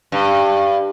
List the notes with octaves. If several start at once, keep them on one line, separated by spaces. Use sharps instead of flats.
G2